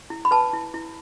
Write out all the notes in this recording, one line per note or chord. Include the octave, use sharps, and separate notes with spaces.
E4
B5
B4 A5
E4
E4